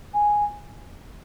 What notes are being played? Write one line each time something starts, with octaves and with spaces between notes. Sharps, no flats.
G#5